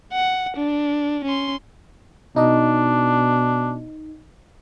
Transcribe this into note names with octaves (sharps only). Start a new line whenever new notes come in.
F#5
D4
C#4 C6
B2 D4 D#4 D#5